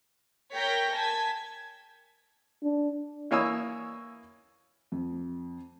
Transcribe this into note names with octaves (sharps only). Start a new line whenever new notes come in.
A#4 C#5 G5 G6 A#6 B6
G#5 A5 G#6 B6
D4
E3 A#3 C#5 G#5 D#6 E6
F2